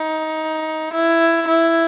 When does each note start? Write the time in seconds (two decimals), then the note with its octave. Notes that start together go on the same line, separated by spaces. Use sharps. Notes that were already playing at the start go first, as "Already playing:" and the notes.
Already playing: D#4
0.93 E4
1.47 E4